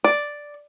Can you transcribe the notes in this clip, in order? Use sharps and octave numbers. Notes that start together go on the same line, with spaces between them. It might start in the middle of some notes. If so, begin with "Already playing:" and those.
D5